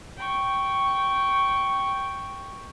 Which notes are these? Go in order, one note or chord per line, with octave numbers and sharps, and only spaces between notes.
G5 C#6